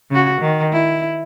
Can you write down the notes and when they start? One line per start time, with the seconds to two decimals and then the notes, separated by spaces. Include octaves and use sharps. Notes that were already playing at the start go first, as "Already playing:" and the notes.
0.11 C#3 F#4
0.41 D#3
0.73 E4